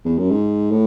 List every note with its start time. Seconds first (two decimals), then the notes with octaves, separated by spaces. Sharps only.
0.05 E2
0.18 F#2
0.31 G#2
0.71 A2